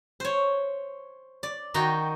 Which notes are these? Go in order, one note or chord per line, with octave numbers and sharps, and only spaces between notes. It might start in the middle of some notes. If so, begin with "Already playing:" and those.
C5 C#5
D5
D#3 D#4 F#4 G5 A#5